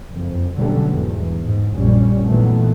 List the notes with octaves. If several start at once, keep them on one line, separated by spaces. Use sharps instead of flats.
F#1 F2
B2 D3 F#3 G3 A3 C#4
E2 G#2 E3
G#2
A#1 F#2 G3 C#4
A#2 D#3 E3 F#3 A3 B3